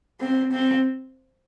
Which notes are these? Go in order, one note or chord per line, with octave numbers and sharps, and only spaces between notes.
C4
C4